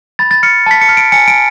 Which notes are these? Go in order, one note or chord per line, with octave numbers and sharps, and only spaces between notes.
B5 A6
A6
F6 C#7
A5 B6
C#7
F6
D7
G#5 C#7
D7